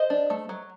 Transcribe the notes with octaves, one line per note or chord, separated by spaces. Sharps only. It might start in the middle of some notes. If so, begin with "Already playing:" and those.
Already playing: C5 D#5
D4
A3
F#3